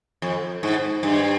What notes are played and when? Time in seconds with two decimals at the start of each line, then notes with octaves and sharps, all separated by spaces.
0.22 F2
0.63 G#2
1.03 G2